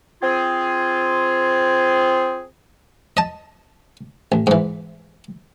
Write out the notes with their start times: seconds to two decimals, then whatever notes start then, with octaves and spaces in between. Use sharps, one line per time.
0.22 C4 F4 G#4
3.17 D#5 A5
4.32 A1
4.47 G#2 E3